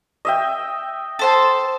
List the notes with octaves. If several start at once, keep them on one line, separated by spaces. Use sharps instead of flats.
D#5 E5 G5
A4 C5 A5